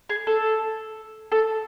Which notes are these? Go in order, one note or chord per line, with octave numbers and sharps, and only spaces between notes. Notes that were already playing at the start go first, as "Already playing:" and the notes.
G#4
A4
A4